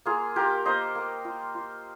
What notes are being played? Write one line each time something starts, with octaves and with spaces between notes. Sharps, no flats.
A#3 F4 G#4
F4 G4 A#4
A#3 C5 D#5
A#3
F4
F4